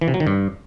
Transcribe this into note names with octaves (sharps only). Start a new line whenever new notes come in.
E3
C3
F#3
D#3
G2